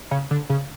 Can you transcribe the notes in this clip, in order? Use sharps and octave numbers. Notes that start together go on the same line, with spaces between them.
C#3
D3
C#3